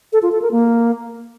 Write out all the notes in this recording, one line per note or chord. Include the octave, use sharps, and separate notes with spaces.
A4
F4
A4
A#4
A#3